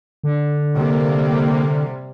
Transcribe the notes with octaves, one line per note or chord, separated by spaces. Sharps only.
D3
C3 G3 A#3